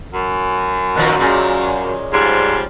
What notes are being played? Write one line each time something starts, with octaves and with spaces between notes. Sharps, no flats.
F#2
A#2 D#3 F3
A#2 G#3 C#4
G#2 F3 G3